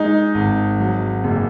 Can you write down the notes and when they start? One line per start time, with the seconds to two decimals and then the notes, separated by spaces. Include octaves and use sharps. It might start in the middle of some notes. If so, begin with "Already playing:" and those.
Already playing: G#3 D#4
0.35 G#1
0.80 F#3
1.24 F#1